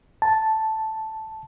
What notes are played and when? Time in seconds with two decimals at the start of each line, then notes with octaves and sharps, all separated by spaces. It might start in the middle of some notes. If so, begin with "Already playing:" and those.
0.22 A5